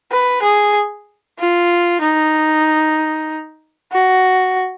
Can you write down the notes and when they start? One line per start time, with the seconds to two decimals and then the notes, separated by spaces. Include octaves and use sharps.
0.11 B4
0.42 G#4
1.39 F4
2.01 D#4
3.92 F#4